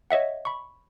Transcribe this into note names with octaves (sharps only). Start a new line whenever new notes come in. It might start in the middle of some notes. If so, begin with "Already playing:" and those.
C#5 D#5 E5 F#5
B5 C#6